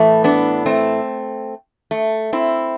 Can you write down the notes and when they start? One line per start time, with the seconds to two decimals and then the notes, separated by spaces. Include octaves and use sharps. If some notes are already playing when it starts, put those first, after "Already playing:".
Already playing: A2 E3 A3
0.24 B3 D4
0.66 A3 C4
1.91 A3
2.33 C4 E4